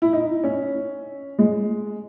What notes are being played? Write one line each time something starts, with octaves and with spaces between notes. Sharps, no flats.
E4
D#4
C#4
G#3